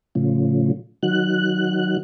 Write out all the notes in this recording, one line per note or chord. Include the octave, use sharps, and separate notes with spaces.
A2 C#3 F3
D#3 F#3 F#6